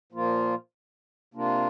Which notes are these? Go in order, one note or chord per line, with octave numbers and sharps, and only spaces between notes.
A#2 F3 A#3 F4
C3 A#3 D4 F4